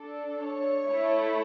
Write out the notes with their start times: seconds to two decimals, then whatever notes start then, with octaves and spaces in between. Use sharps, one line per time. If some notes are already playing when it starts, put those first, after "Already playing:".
Already playing: D4 A4
0.39 C#5
0.88 A3 E4 A4